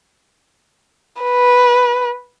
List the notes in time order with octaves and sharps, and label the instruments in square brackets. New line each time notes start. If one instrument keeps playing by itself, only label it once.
[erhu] B4